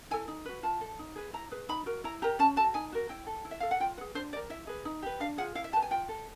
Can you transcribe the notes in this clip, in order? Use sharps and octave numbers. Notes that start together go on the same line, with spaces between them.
E4 A4 G#5
D#4
F#4 B4
F4 A5
A4
D#4
G#4 B4
E4 A#5
G#4 B4
D#4 B5
F#4 A#4
E4 A#5
G4 A#4 A#5
C#4 A5
F#4 A4 A5
D#4 G#5
F#4 A#4
E4 G5
A4
E4
E5
A4 F5
F#5
F4 G5
G#4 B4 F#5
D4 C5
G4 A#4 D5
E4 E5
G#4 B4
D#4
G4 B4
D4 F5
F4 G#4 F#5
E4 F5
E5
G4 B4 A5
G#5
F4 G5
A4